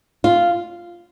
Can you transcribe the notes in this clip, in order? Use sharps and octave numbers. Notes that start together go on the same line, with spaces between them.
F4